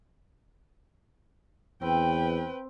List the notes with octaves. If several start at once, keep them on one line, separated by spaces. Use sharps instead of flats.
E2 C4 B4 G5